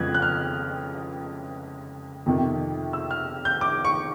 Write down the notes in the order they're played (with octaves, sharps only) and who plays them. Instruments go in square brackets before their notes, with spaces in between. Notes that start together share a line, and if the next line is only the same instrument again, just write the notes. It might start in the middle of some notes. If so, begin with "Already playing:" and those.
Already playing: [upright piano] F2 C#3 F3 G#3 B3 F#6 G#6
F#6
F6
F2 C3 D#3
E6
F6
G6
D6
C#6